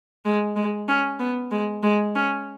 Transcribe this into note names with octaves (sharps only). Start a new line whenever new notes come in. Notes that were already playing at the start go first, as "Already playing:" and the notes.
G#3
G#3
C#4
B3
G#3
G#3
C#4